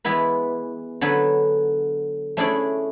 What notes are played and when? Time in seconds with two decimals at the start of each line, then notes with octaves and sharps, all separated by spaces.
0.05 E3 G#3 B3 E4 B4
1.01 D3 F#3 G#4 A4 B4
2.37 A3 C#4 D4 E4 G#4 D5